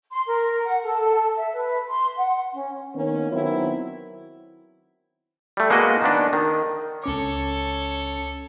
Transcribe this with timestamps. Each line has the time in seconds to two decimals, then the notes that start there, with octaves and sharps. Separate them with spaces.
0.11 C6
0.26 A#4
0.64 F#5
0.83 A4
1.36 E5
1.55 B4
1.88 C6
2.16 F#5
2.52 C#4
2.94 D#3 A#3 B3 C#4
3.30 D#3 F#3 B3 C4 E4
5.57 G3 A3
5.70 G#3 A#3 B3 F#4 D#5
6.02 D#3 B3 D4
6.33 D#3
7.04 C#2 C#4 A4 C#5 D6